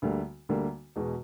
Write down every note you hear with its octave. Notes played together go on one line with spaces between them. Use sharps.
D2 D3 G3 A#3
D2 D3 G3 A#3
E2 B2 G#3